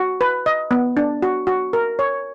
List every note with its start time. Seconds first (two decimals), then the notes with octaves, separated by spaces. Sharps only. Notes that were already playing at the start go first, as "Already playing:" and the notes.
Already playing: F#4
0.21 B4
0.46 D#5
0.71 B3
0.97 D4
1.22 F#4
1.47 F#4
1.73 A#4
1.99 C#5